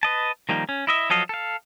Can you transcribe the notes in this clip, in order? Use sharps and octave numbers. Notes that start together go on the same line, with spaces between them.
B4 D#5 A5
D#3 F3 G3 A#3 D#4
C#4
E4 D#5 E5
F3 F#3 A4 D#5 F5
A4 F5